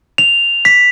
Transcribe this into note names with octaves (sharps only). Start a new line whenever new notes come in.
F7
B6